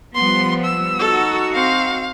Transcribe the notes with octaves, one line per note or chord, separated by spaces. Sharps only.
F3 G3 B3 C6
E6
D#4 F#4 A4
C4 F5